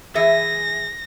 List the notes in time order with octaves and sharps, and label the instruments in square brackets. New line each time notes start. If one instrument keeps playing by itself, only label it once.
[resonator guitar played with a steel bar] E3 G#4 E5 [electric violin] A#6